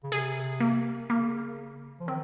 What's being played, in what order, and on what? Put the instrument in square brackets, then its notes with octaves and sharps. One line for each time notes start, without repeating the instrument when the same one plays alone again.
[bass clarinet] C#3
[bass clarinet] C3 [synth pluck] G#4
[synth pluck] A#3
[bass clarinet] C#3 [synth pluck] A#3
[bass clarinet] F3
[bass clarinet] D#3 [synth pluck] C4